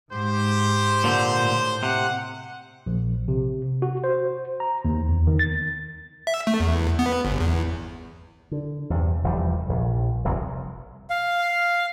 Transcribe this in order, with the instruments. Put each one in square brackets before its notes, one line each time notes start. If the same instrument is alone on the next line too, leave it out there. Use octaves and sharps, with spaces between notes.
[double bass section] G#2 [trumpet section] G4 C5
[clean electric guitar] A#2 D3
[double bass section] A2
[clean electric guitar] C3 [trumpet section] F#5
[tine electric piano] A#1
C3
F#4
C5
A#5
D#2
E2
D#3
A6
[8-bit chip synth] E5
A3
E2
B3
G1
E2
[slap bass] D3
E2 G2 C3
F1 E2 F3 G3
A#1
F1 C2 F2 C3
[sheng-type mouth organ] F5